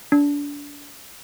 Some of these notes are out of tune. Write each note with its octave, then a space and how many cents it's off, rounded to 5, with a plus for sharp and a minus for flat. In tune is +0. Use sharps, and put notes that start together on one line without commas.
D4 -30